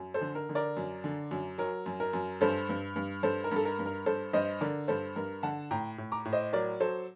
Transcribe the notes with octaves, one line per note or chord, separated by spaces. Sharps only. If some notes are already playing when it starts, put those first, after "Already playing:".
Already playing: F#2
A4 C5
D3
A#4
D3
A#4 D5
F#2
D3
F#2
F#3 A#4
F#2
A#4
F#2
G2 A4 C5
G2
G2
G2 A4 C5
A#4
G2 A4
A#4
G2
A#4
G2 A4 C5
G2 C5 D#5
D3 A#4 D5
G2 A4 C5
G2 A#4
D3 F#5 A5
A2 G5 A#5
A2
A#5 D6
A2
C5 D#5
F#3 A#4 D5
F#3 A4 C5